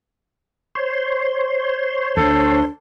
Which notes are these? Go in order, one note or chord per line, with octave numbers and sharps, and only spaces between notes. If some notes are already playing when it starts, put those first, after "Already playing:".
C5 C#5 C6
D2 D4 A4